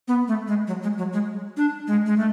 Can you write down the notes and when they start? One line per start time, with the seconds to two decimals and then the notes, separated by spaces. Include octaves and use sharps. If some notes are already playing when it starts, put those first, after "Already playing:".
0.08 B3
0.28 A3
0.48 G#3
0.68 F#3
0.83 G#3
0.98 F#3
1.13 G#3
1.57 D4
1.87 G#3
2.06 G#3
2.17 A3